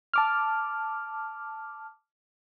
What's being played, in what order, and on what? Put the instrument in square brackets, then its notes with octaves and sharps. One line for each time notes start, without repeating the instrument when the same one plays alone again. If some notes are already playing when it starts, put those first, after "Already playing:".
[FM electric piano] A5 D6 F6